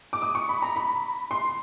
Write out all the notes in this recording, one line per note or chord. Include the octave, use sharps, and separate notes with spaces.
D6
D#6
C#6
B5
A#5
B5
C6